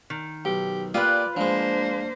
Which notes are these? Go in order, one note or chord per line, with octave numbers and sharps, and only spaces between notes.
D#3
B1 G4
A#2 F4 G4 B4 D5 D#6
F3 G#3 A#3 D4 C5